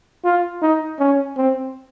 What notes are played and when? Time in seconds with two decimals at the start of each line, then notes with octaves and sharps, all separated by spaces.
0.25 F4
0.62 D#4
1.00 C#4
1.37 C4